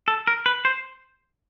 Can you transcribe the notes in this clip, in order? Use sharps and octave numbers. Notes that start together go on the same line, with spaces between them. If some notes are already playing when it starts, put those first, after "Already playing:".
A4
A#4
B4
C5